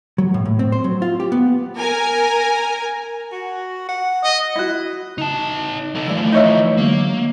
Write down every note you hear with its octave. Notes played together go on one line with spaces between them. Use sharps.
F#3
A2
A2
C4
C5
F#3
F4
G4
B3
A#4 G#5
F#4
F#5
D#5
E4 F#4
C#3 D#4 A5
D#4 A4
E3 F3 A3 D5 E6
D#4 C#5 E5
D3 F#3 G#3 A#3